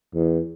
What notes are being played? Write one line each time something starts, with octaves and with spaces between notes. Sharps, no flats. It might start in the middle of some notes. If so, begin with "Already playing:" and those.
E2